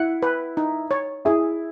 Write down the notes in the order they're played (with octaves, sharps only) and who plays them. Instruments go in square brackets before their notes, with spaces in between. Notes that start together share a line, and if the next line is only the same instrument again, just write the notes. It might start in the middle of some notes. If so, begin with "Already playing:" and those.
Already playing: [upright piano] E4 [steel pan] F#5
[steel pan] B4
D#4
C#5
[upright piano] E4 [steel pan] G#4